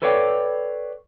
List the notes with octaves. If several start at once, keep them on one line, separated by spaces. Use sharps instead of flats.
A4 B4 C#5 D5 F5 G5